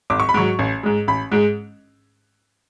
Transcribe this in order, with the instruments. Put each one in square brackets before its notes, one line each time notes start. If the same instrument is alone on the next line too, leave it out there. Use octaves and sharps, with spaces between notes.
[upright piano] G#1 D6
C#6
B5
G#2 F#3 C#6
A1
G#2 G#3
A1 B5
G#2 G#3